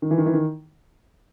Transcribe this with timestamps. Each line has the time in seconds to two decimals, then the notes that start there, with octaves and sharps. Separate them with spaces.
0.02 D#3
0.11 E3
0.18 D#3
0.26 E3
0.34 D#3